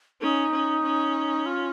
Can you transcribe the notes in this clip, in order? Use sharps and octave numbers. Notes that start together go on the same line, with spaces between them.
C#4 D#4
C#4
C#4
F4